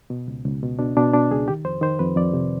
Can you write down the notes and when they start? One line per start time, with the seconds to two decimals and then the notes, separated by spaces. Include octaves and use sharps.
0.10 B2
0.28 C#2
0.45 C#2
0.62 B2
0.79 B2 D4
0.96 B2 D4
1.13 B2 D4
1.31 C#2 G#4
1.48 D#3 G4
1.65 F2 C5
1.82 D#3 C5
1.99 F2 B4
2.16 F2 D5
2.33 C3